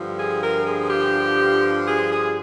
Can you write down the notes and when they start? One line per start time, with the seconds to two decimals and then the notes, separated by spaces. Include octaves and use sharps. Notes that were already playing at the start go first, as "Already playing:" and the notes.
Already playing: G2 D3 F3
0.17 G#4
0.40 A#4
0.64 G#4
0.89 G4
1.86 G#4
2.10 G#4